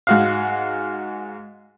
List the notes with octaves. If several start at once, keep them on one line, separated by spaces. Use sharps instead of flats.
G#2 F#4 F5